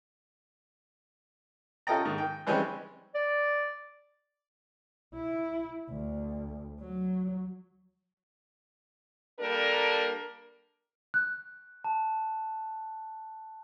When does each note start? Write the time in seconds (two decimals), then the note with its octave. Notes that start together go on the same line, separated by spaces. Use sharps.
1.87 C#4 F4 A4 D#5 G5 A#5
2.05 G#2 D#3
2.18 G5
2.47 E3 G3 G#3 C4 C#4
3.15 D5
5.14 E4
5.90 D2
6.81 F#3
9.40 G3 A#3 D4 A4 A#4
11.14 F#6
11.84 A5